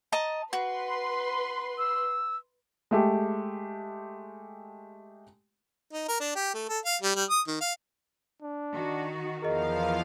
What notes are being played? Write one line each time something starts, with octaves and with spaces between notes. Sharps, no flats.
D#5 A5 A#5
F#4 B4 C6
E6
G#3 A3 G4
D#4
A#4
D4
G4
A3
A4
F5
G3
G3
D#6
D#3
F5
D4
D#3 D#4 F#4
E2 F3 G#4 A#4 D#5 F5